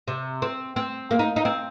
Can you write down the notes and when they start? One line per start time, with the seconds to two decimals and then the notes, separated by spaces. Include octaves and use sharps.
0.07 C3
0.42 C4
0.76 C4
1.11 A#3
1.19 D#4
1.36 D#4
1.45 C4